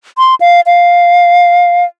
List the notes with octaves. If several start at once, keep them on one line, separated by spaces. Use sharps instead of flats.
C6
F5
F5